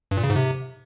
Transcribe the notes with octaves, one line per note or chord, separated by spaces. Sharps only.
G2
A#2
C#3
G#2
C3